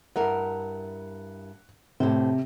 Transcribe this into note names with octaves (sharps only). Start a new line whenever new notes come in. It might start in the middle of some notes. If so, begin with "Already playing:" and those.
G2 E4 A#4 F#5
A2 C3 C5